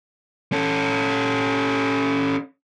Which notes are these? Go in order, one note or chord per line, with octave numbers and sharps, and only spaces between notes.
C#4 A4